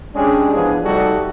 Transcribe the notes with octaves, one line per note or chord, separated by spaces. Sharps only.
G#3 C#4 D4 G4 G#4
E3 F3 B3 D4 G#4
C3 G3 A3 D#4 F#4 A4